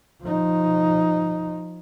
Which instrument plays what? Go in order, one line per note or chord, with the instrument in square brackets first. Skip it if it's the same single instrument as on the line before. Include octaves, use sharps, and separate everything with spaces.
[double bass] F3 D#4